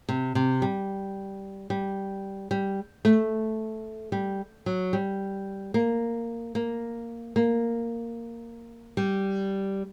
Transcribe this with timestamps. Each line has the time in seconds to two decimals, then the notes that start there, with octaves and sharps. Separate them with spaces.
0.09 C3
0.35 C3
0.62 G3
1.70 G3
2.51 G3
3.05 A3
4.12 G3
4.66 F#3
4.93 G3
5.74 A#3
6.55 A#3
7.36 A#3
8.97 G3